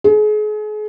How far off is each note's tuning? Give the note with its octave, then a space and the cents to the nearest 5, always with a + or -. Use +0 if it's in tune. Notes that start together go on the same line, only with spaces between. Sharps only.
G#4 +35